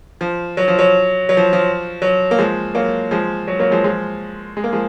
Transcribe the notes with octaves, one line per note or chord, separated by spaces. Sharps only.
F3
F#3
F3
F#3
F#3
F3
F3
F#3
A#3
F3 G#3
F#3 A#3
F3 G#3
F#3
F#3 A#3
F3 G#3
F3 G#3
G#3
A#3
F3 G#3